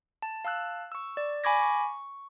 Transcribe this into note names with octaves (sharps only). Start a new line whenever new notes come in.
A5
F5 A5 E6 F#6
C#6 E6
D5
G#5 B5 C#6 D6 G#6 A#6
C#6